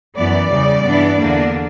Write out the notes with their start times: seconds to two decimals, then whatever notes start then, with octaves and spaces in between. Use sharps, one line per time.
0.16 F#2 E3 B3 D5
0.50 E2 C#3 G3
0.84 G2 E3 B3 D4
1.18 E2 D3 A#3 D4